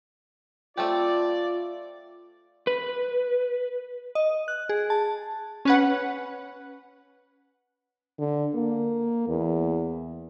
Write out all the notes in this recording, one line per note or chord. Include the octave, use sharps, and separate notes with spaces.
A3 C4 F4 G4 D5
B4
D#5
F#6
G#4
A5
C#4 B4 F#5
D3
A#3
E2